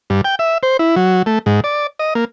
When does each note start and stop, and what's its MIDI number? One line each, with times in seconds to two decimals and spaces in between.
0.10 0.21 43
0.24 0.35 79
0.39 0.58 76
0.63 0.77 72
0.79 0.95 64
0.96 1.22 54
1.26 1.39 57
1.46 1.60 44
1.64 1.87 74
1.99 2.14 75
2.15 2.25 58